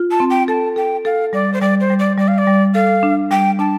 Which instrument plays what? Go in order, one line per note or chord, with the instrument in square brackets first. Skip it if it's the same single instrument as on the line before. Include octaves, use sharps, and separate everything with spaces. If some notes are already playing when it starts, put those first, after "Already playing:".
Already playing: [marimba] F4
[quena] A5
[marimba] C4
[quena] G5
[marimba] A4 [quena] A5
[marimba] A4 [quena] G5
[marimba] A4 [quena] F5
[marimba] G3 [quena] D5
[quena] C5
[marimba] G3 [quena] D5
[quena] C5
[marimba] G3
[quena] D5
[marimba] G3 [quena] D5
[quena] F5
D5
[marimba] G3
[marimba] A4 [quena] F5
[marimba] D4
[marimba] G3 [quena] G5
[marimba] D4 [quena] A5